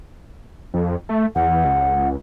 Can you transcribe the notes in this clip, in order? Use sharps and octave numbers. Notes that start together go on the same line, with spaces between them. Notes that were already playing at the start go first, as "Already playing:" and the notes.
F2
A3
E2 F#5
C#2